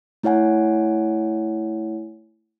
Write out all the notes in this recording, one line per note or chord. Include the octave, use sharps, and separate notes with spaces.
A3 E4 C#5 F#5 G#5